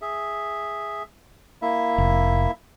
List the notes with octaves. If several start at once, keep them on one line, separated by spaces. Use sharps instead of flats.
G#4 E5
A#3 E4 E5
F1